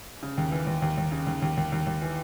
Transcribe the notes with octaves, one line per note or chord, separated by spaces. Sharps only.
C#3
D#2
E3
D#2
D#2
D#2
C#3
D#2
D#2
D#2
D#2
D#2
E3